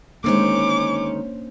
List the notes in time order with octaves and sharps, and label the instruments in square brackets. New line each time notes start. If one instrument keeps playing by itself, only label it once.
[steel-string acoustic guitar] D2 D#3 G#3 [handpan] A#3 D4 C5 [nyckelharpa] C#4 [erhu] D6